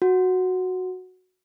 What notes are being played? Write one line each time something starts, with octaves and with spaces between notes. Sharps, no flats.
F#4